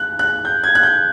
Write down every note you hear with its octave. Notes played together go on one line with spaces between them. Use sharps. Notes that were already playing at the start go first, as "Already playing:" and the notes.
Already playing: F#6
F#6
G6
G#6
F#6
G6